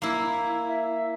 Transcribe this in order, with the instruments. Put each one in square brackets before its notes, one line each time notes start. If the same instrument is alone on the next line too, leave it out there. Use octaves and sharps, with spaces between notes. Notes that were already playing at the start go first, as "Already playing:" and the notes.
[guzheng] A#3 E4
[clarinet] E5